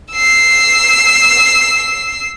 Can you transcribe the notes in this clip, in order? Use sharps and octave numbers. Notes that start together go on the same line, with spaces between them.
E6 C7